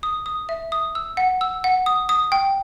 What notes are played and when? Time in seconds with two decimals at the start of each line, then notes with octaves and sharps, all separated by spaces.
0.03 D#6
0.26 D#6
0.49 E5
0.72 D#6
0.95 E6
1.17 F#5
1.41 E6
1.64 F#5
1.86 D#6
2.09 D#6
2.32 G5